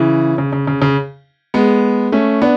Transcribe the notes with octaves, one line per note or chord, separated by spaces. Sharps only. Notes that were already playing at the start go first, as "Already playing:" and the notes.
Already playing: C#3 E3
C#3
C#3
C#3
C#3
G#3 B3
A3 C#4
B3 D4